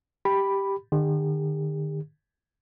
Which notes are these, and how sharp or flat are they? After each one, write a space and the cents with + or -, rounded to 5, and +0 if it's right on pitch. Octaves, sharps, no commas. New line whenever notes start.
G4 +0 B5 +0
D#3 -45 G4 +45